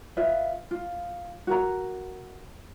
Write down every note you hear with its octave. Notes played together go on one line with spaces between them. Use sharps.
F4 B4 D#5 E5
F4
F#4 A#4 A#5